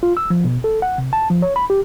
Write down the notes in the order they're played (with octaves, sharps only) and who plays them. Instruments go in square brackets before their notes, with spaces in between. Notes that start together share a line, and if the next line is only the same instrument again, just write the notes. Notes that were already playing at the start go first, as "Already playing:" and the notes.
[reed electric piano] F4
E6
F3
B2
A4
F#5
C3
A5
F3
C#5
B5
G4